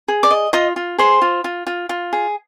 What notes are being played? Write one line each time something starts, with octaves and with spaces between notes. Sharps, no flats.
G#4
D5 D6
D#5
F4 D#5 D#6
F4
G#4 C5 C6
F4
F4
F4
F4
G#4